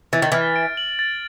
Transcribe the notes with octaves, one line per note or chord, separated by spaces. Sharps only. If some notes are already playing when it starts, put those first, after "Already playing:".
E3 A6
D#3
E3 F6
D7
F#7
A6